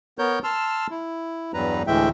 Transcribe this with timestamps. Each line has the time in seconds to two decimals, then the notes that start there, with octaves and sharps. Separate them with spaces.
0.19 B3 A#4 C#5 G6
0.44 A5 C6 E6 F6
0.91 E4
1.54 E2 G2 F#3 G3 B4 A#5
1.87 D2 A2 E3 G#3 E5 G5